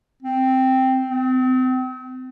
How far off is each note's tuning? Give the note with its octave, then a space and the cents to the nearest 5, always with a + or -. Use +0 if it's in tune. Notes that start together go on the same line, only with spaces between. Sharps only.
C4 +0
C4 -35